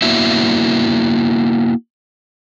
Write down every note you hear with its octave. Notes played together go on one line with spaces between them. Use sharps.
A#3 B3 D4 E4 F#4 E5